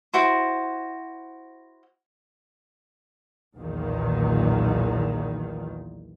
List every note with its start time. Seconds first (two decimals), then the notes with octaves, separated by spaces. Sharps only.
0.14 E4 F#4 C5
3.56 B1 E2 A#2 D#3